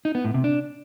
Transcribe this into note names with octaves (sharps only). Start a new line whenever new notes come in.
D#4
B3
A2
C3
D4